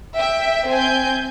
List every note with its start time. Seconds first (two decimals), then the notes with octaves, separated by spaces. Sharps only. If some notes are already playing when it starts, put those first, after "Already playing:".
0.18 E5 G5
0.69 C4 G#5 G6